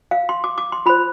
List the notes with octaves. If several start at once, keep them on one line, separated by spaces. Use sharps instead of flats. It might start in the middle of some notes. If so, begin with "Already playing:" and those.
F5
C6
D6
D6
C6
F4 C5 B5